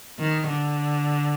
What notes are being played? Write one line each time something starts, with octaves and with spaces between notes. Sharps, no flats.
D#3
D3